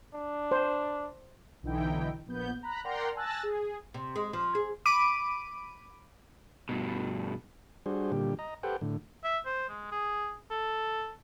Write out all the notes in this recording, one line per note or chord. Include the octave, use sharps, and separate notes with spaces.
D4
C5
B1 D3 E3 D#4 E4 G5
A#1 B3 G6
A#5 B5 F#6
A#4 D5 F#5 G5 A#5 C6
G#5 A5 E6 F#6 A6 A#6
G#4
C3
G#3
F3
G#4
B5 D6 D7 D#7
G2 B2
G3 D4 F#4 G#4 C5
A#2 D3 G3 G4
D#5 A#5
G4 A4 B4 C5 F#5 G5
A2 D3
E5
C5
G#3
G#4
A4